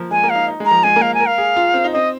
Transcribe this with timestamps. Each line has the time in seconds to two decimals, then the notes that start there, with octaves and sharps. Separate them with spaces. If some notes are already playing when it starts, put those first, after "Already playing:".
Already playing: F3 A#3
0.11 G#3 G#5
0.23 A#3
0.30 F5
0.35 D#4
0.48 D#4
0.60 G#3
0.65 A#5
0.71 F3
0.83 G#3 G#5
0.96 A#3
1.02 F5
1.14 G#5
1.20 A#4
1.27 F5
1.38 G#4
1.56 F4
1.74 C4
1.84 D#4
1.93 C4 D#5